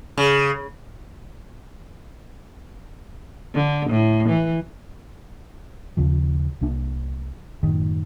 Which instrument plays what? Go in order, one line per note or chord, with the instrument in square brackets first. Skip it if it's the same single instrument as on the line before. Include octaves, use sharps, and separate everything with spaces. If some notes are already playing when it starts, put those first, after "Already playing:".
[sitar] C#3
[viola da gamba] D3
A2
E3
[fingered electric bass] D#2 C#3 F3
C2 A#3 D4
F#2 A2 D#3